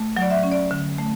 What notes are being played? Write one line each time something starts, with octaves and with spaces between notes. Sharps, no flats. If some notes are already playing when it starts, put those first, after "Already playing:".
Already playing: A3
F#3
D5
E5
C#4
D5
D3
A3